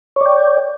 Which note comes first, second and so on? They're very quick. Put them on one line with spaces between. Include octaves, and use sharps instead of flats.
C#5 D5 G5